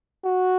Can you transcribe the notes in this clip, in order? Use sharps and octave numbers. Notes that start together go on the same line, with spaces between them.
F#4